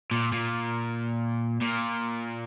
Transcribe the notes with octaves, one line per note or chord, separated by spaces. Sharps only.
A#2
A#2
A#2